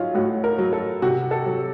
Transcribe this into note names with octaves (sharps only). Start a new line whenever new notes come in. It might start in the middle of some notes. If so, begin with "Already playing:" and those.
Already playing: F#3 C#4 D#4 F4
A2 F#4
A#4
F#3
A4
C3 F#4
A4
F#3